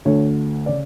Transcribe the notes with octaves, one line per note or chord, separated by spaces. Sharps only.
D2 D3 A3 C#5
C#3 D5